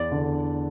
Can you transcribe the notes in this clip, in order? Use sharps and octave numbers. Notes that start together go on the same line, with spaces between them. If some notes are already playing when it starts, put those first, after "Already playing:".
Already playing: E2 D5
D3